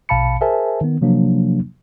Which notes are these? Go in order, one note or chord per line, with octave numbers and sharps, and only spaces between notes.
A#1 B2 F5 A5 B5 C#7
G#4 A#4 C5 E5 G#5 A5
D#3 B3
C3 F3 F#3 A#3 D4